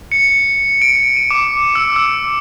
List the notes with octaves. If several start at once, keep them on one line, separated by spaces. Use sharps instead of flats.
C#7
D7
D#7
D6
E6
E6